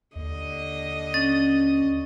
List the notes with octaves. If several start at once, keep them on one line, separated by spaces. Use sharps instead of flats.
D#2 D3 D#5
C#4 A6